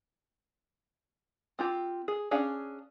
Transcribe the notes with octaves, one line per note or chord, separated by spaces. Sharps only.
C4 F4 G4
G#4
C#4 D4 G#4 F5